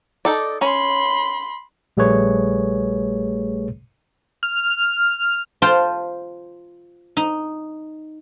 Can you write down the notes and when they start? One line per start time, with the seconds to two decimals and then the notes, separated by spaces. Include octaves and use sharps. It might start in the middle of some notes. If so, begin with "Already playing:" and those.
0.25 D#4 A4 D5
0.61 C#4 B5 C6
1.97 A#1 G3 A3 G#4 B4 C#5
4.43 F6
5.62 F4 C5 G5 A5
7.17 D#4